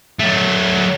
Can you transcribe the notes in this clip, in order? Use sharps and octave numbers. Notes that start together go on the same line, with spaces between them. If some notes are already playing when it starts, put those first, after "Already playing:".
F#3 A3